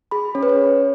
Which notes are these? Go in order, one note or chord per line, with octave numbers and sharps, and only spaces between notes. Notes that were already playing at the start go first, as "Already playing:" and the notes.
G#4 B5
C#4 C#5
B4
C#5